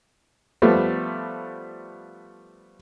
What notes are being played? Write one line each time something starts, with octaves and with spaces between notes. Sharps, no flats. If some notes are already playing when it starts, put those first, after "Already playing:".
F3 G3 A3 B3